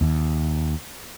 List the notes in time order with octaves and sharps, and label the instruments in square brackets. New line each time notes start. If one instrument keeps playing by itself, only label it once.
[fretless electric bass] D#2